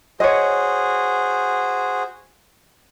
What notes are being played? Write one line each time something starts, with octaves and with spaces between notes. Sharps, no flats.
F#4 G#4 C5 C#5 D#5